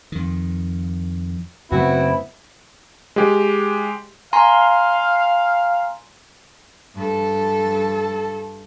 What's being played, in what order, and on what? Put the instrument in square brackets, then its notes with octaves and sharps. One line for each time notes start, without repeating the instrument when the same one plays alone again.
[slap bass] F2 D#3
[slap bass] F#2 C#3 A3 [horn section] B3 C4 E4 [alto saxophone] F#4
[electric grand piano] G#3 G4
[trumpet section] F5 [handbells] G#5 A#5 C6
[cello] G2 A4